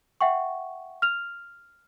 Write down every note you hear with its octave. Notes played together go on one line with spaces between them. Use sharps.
E5 F#5 G5 C#6
F6 F7